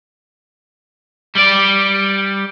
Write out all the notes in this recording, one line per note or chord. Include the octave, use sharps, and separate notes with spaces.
G3 D5